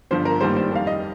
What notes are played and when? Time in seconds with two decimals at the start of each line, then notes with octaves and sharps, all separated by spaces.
0.11 G1 G2 F3 C5
0.25 A#4
0.41 A#1 G#2 D#3 G3 C5
0.56 C5
0.72 F2 D#3 G3 F5
0.87 D#5